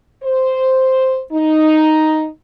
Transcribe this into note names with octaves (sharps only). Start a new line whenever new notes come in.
C5
D#4